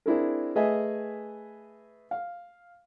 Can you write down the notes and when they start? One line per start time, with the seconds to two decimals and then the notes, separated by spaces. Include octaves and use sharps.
0.06 C4 D4 E4 G#4 A#4
0.55 A3 G#4 B4 D#5 E5 G#5
2.11 F5